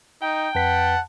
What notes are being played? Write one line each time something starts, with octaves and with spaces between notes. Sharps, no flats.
D#4 G5
F2 B4 F#5 A5 B6